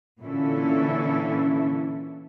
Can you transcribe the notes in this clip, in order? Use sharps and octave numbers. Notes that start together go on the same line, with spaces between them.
A#2 D3 E3 C#4 E4 A4